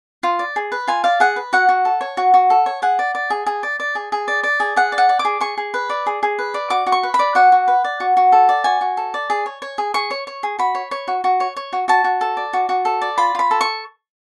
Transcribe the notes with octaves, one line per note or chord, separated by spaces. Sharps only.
F4
D5
G#4
B4
F4 G#5
D5 F5
G#4 F#5
B4
F#4 F#5
F#4
A4
C#5
F#4
F#4
A4
C#5
G#4 F#5
D5
D5
G#4
G#4
D5
D5
G#4
G#4
D5
D5
G#4
G#4 F#5
D5
F#5
D5
D6
G#4
G#4 C#6
G#4
B4
D5
G#4
G#4
B4
D5
F#4 D6
F#4
C#6
B4
B5
D5
F#4 F#5
F#4
B4
D5
F#4
F#4
A4
D5
F#4 G#5
F#4
A4
D5
G#4
C#5
C#5
G#4
G#4 C#6
C#5
C#5
G#4
F#4 B5
C#5
C#5
F#4
F#4
C#5
C#5
F#4
F#4 A5
F#4
A4
D5
F#4
F#4
A4
D5
F4 B5
F4 B5
A4
C#6